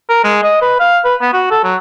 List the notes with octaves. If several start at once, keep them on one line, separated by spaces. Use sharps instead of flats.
A#4
G#3
D#5
B4
F5
B4
B3
F#4
A4
F#3